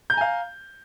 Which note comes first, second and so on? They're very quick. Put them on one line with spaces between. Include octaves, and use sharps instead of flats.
G6 A#5 G#5 F5